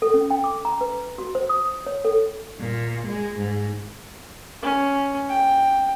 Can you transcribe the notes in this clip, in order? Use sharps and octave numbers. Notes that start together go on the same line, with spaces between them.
A4
C#4
G5
D6
A#5
B4
F#4
C5
D#6
C#5
A4
A#2
G#3
G#2
C#4
G5